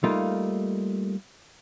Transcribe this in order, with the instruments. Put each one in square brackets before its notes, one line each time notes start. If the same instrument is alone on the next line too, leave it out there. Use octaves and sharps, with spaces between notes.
[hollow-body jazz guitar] G3 A3 A#3 D#4 F4